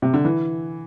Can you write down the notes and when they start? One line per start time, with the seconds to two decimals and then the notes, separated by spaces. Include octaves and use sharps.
0.02 C3
0.14 D3
0.25 E3